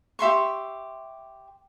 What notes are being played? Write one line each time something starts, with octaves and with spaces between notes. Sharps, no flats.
G4 E5 C6 C#6